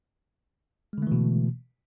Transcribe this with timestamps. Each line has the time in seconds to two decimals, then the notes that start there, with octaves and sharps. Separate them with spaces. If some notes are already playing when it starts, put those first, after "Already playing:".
0.93 G#3
0.98 D3
1.02 A3
1.07 E3
1.12 B2